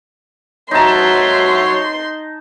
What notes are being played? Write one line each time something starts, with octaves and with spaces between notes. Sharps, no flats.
F#3 D#4 C#5 E5 A5 C6